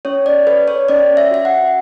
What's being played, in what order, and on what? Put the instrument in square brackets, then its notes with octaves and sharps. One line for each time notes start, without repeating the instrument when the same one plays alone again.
[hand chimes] C#4 C#5
D5
A4 B4
C#5
C#4 D5
E5
F#4 E5
F#5